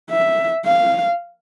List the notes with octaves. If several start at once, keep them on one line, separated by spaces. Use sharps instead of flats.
E5
F5